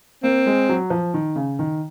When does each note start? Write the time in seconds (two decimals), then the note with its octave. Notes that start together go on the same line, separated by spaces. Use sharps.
0.23 A#3 C4
0.46 G#3
0.69 F#3
0.90 F3
1.14 D#3
1.36 C#3
1.59 D#3